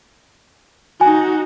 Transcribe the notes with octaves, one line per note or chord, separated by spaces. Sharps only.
D#4 F#4 G#5